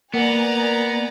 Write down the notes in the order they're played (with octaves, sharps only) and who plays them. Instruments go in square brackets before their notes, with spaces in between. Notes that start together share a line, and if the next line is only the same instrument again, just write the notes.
[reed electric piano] A#3 [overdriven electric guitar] B3 [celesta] A#4 F#5 [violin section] D5 G#5 A#5